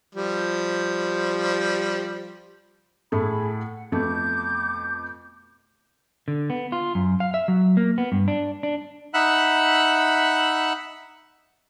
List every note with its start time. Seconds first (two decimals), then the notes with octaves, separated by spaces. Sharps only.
0.15 F3 G3
3.12 A2 A3 G#4 B5
3.56 F#5
3.92 F2 B2 A3 D6 G6
6.28 D3
6.50 B3
6.72 F4
6.95 F#2
7.20 F5
7.34 E5
7.48 F#3
7.77 A#3
7.98 B3
8.12 G2
8.28 D4
8.63 D4
9.14 D#4 E5 F#5 B5 E6 F#6